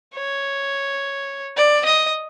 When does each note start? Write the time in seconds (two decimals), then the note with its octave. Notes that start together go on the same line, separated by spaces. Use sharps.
0.15 C#5
1.56 D5
1.85 D#5